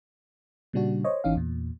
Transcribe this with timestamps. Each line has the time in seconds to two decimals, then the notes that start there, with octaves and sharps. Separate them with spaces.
0.73 A#2 C#3 G3 D4 F#4
1.04 C5 C#5 D#5
1.24 G#1 E3 C#4 D#4 F5
1.35 E2 A#2